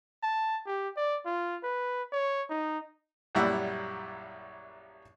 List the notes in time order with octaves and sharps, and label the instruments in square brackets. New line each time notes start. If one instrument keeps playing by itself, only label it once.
[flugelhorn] A5
G4
D5
F4
B4
C#5
D#4
[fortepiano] A#1 F#2 G3 E4 E5 F#5